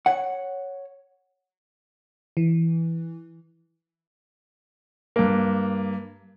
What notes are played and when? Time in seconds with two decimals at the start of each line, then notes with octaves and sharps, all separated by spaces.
0.06 C#5 F#5
2.37 E3
5.16 G2 A#3